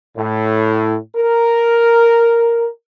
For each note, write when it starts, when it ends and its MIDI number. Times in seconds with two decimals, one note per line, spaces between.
0.17 0.97 45
1.15 2.67 70